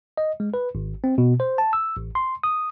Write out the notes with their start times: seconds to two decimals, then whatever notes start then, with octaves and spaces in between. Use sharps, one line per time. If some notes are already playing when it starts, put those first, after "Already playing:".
0.17 D#5
0.40 G#3
0.54 B4
0.75 G#1
1.04 C4
1.18 B2
1.40 C5
1.58 A5
1.73 E6
1.97 A1
2.15 C6
2.43 D#6